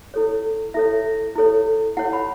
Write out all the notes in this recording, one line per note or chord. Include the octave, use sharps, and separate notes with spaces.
E4 A4 C#5
E4 A4 C#5 E5
E4 A4 C#5
E4 C#5 F#5
B5